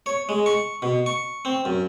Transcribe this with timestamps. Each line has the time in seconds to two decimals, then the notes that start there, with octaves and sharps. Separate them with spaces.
0.06 C#5
0.29 G#3
0.46 C#6
0.82 B2
1.06 C#6
1.45 C4
1.65 F#2